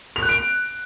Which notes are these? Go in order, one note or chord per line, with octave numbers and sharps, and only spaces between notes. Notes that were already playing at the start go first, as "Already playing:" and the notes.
F7
F#6
D7